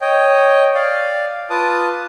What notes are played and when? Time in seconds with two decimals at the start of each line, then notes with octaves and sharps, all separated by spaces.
0.01 C#5 D#5 G5
0.75 D5 F5
1.50 F4 B4 A5 D6 D#6